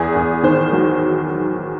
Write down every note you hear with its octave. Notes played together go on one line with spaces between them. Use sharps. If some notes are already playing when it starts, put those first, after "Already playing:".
Already playing: E2 G#4
E2
D#3 C5
F#3